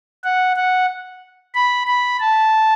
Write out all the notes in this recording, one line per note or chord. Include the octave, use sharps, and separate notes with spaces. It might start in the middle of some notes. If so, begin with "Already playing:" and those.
F#5
F#5
B5
B5
A5